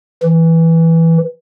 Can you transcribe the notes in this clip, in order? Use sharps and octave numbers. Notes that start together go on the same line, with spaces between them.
E3